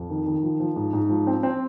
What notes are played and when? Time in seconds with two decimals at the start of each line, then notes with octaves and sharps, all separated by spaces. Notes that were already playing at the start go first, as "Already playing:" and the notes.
Already playing: F2
0.10 D#3
0.26 D#3
0.43 F3
0.60 F3
0.76 G#2
0.93 G#2
1.10 F3
1.27 C4
1.43 C4